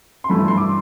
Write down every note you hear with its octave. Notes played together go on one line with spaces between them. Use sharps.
C6
G2 E3 A3 E4 B5
C6
D6